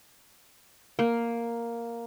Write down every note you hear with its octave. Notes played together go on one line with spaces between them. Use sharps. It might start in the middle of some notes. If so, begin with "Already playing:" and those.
A#3